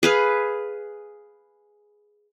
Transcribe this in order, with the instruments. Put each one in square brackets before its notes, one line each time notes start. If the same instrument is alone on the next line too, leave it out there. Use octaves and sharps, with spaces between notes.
[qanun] G#4 B4 F5